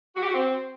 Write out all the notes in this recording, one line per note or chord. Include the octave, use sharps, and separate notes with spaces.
F#4
G4
F#4
C4